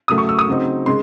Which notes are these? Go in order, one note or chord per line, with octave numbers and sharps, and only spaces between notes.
C#3 F#3 A3 D#6
C#6
E6
D#6
C#3 F#3 C4 D#4
C#3 G#3 C6